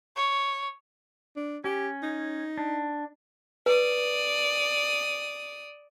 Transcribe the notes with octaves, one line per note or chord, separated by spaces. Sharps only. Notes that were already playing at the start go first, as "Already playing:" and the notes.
C#5
D4
C#4 G4
D#4
D4
B4 D5 D#6